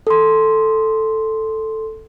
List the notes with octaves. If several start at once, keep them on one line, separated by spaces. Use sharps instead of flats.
A4 C6